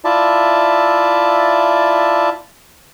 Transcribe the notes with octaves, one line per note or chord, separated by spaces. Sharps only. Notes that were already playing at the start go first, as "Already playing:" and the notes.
E4 F4 D5 E5 A5